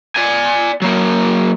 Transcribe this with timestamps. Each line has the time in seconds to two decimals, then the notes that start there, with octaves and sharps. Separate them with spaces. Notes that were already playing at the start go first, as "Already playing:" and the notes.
0.16 D5 G#5
0.82 F#3 A#3